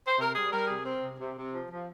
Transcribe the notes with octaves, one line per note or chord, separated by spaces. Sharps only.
C5
C3 A#4
G3 G#4
G3 A#4
C3 G#4
C4
C3
C3
C3
F3
F3